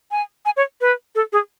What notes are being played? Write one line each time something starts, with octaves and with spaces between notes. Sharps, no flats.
G#5
G#5
C#5
B4
A4
G#4